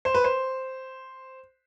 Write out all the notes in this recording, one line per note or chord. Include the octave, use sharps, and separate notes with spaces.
C5
B4
C5